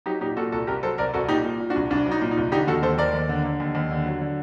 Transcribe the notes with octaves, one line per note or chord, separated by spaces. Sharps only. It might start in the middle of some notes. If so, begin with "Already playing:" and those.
F#3 D#4 G4
A#2 D#4 G4
A#2 F#4 A4
C2 F#4 A4
C2 G4 A#4
F#3 A4 C5
C2 A#4 D5
C2 F#4 A4
A#2 D#4 G4
A#2
A#2
D4 F#4
C2
C2 D4
F#3
D#4
A#2
D#4
C2
D3 D#4 G4
D#2 F#4 A4
D#2 A4 C5
D#2 A#4 D5
D#2
D3
D3
D#2
D#2
D3
F#3
D3